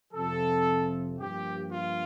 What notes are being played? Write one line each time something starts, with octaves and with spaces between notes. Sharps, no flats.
F2 C3 F3 A4
G2 F3 A#3 G4
F4